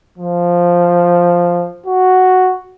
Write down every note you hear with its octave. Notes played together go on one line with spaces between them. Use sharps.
F3
F#4